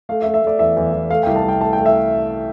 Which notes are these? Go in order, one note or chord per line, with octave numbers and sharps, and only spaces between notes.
A3 F5
E5
A3
E5
A3 D5
E2 E5
E2
E2
A3 F5
C2 G5
A5
C2
G5
A3 A5
A3 G5
E5